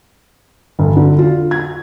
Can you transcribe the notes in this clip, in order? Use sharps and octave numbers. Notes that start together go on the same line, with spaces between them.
G1
D3
F4
G#6